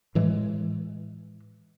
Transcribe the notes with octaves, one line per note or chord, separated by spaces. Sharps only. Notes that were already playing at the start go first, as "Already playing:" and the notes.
A2 E3 G#3